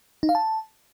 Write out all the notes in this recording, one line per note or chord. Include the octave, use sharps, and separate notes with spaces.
D#4
F5
A5